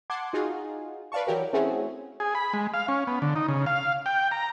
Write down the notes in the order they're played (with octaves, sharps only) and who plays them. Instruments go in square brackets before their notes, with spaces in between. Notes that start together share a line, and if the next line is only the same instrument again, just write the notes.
[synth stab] F#5 A5 C6 D6 G#6
D#4 F4 F#4 G#4
B4 D5 F5 A5 C#6
E3 F#3 G4 A#4
A3 C4 C#4 E4 F#4 G#4
[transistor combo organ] G#4
B5
G#3
F5
C#4
B3
D3
D#4
C#3
F5
G5
A#5